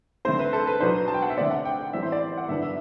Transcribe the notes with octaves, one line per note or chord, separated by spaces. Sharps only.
D3 A3 C4 C5
B4
A4
B4
B2 F#3 B3 D4 C5
A5
G5
F#5
E5
D3 A3 C4 D5
F#5
G5
G5
A2 E3 G3 C4 E5
C5
D5
F#5
G2 D3 F#3 B3 D4 E5
E5